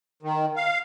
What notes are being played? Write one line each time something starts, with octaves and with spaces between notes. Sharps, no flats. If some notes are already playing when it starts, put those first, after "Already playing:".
D#3
F5